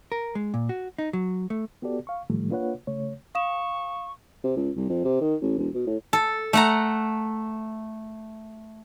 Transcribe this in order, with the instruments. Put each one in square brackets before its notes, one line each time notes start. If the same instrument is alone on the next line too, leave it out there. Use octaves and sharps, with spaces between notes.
[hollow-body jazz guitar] A#4
G#3
A#2
F#4
D#4
F#3
A3
[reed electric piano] B3 F#4 G4 A4 D5
F5 C#6
A2 D#3 F3 G3 A3
A#3 D4 F4 B4 C#5 F#5
C#3 A3 C#5
[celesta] F5 D#6 E7 [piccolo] C#6
[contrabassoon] C3
C#2
C2
F2
C3
D#3
A1
E1
B2
A2
[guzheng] A4
A3 F#5 A#5